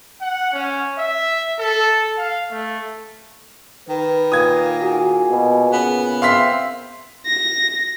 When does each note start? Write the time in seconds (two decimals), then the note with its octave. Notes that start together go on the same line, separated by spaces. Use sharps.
0.21 F#5
0.53 C#4
0.99 E5
1.60 A4
2.18 F5
2.51 A3
3.89 D#3 B4
4.32 A#2 F5 D#6 G#6
4.82 F#4 G#4
5.30 B2
5.72 C#3 B3
6.22 C4 E5 F5 C6 B6
7.26 A#6